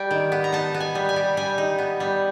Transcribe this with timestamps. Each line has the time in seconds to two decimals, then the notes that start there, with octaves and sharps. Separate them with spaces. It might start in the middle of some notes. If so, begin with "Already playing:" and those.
Already playing: G3 G5
0.11 D#3
0.32 B3
0.44 A#5
0.52 D#4 A5
0.74 B3
0.80 G#5
0.95 G3
1.09 G#5
1.16 G3
1.37 G3 G#5
1.58 D#4
1.78 B3
2.00 G3